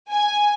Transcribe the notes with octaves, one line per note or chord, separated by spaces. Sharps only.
G#5